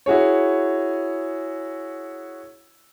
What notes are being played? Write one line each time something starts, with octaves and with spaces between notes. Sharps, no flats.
E4 F#4 G#4 C#5